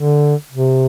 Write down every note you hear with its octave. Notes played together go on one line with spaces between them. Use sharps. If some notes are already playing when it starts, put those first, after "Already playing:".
Already playing: D3
C3